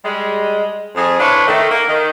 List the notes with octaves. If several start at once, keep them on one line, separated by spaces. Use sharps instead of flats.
G3 G#3
F2 G#4
D4 E4 F4 B4 C#5
D#3 A3
A#3
D#3